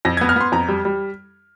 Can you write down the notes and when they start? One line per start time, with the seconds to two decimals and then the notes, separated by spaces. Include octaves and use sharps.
0.05 F2 A#6
0.17 G#6
0.21 B3
0.29 F6
0.36 B3 C6
0.52 F2 A#5
0.68 G3
0.85 G3